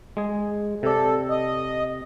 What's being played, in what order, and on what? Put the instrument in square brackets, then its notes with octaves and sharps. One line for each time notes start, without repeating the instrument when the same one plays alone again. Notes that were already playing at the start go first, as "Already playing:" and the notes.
[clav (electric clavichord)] G#3 G#4
[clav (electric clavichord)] C3 D5 [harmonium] A4
[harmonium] D#5